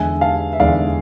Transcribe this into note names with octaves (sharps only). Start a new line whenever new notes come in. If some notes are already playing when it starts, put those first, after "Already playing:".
Already playing: E2 D3 G#3 E5 G#5
F5 A5
E5
E2 D3 G#3 D5 F5